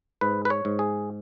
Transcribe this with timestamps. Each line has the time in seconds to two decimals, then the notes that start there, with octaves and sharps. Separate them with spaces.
0.21 G#2 B4
0.45 B4
0.50 C#5
0.65 G#2
0.79 G#4